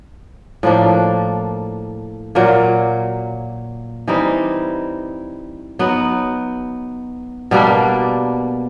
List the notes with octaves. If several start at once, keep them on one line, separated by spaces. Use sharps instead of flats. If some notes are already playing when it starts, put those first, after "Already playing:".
A2 F3 A#3 D4
A#2 F#3 A#3
E3 G3 C4 D#4
F#3 B3 D#4
B2 G3 A#3 D4